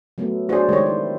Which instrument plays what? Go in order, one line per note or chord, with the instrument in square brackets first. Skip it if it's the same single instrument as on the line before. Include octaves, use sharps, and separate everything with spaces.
[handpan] F#3 A3 B3
[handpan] D4 C5 D5 [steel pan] F#4 G#4
[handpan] D#3 G4 [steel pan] G#3 C#5
[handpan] E4